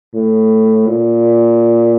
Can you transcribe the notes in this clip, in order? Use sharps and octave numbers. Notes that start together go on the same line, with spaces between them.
A2
A#2